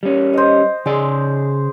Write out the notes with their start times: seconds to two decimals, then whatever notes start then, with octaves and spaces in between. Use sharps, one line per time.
0.03 G3 C#4
0.33 C5 D#5
0.86 C#3 G#4 D5